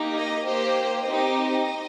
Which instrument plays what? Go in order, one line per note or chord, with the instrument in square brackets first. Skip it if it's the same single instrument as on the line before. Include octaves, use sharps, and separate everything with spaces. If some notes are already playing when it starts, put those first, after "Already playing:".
Already playing: [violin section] A#3 D#4 G4
D#5
A#3 G4 C5
C4 D#4 G4 D#5